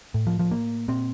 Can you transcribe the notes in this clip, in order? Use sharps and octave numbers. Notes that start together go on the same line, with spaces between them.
A2
F3
F3
A#3
A#2 C4